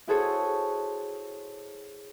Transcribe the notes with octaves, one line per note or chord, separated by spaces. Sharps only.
E4 F#4 G#4 A4 C5 C#5